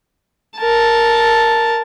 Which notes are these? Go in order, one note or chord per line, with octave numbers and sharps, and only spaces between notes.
A#4 A5